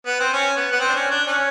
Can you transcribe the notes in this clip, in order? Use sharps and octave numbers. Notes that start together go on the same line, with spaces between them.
B3
C4
C#4
B3
B3
C4
D4
C#4
D4
C#4